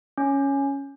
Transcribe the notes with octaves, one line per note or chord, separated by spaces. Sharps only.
C#4